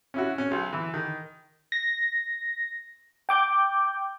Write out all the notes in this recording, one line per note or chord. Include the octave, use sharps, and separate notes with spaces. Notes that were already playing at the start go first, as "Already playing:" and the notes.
C#4 E4 F#4
C#4
B1
E3
D#3
A#6
G5 D6 G6